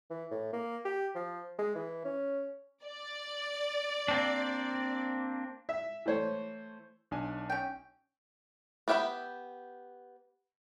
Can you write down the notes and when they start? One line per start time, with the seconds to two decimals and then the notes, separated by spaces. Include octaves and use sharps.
0.10 E3
0.31 A2
0.53 A#3
0.85 G4
1.15 F3
1.58 G#3
1.75 E3
2.05 C#4
2.85 D5
4.08 A#3 C4 D4
5.69 E5
6.06 E3 A3 C5 C#5
7.11 B1 D4 G#5
7.50 C#4 G5
8.88 B3 G4 E5 F5 B5